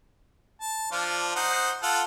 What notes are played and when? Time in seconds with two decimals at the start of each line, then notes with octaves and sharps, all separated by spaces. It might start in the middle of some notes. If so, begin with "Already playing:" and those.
0.61 A5
0.92 F3 D4 F4
1.36 D#4 C5 F#5
1.82 F4 A4 F#5